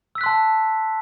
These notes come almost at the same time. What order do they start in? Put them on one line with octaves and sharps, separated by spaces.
E6 B6 F#6 C6 A5